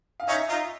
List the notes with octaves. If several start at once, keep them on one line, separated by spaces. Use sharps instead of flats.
F5
C#4 D#4 E5
D#4 F4